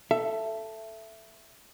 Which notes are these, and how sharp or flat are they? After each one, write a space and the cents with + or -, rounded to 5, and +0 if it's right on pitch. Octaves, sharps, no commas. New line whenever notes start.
A4 +0 E5 +15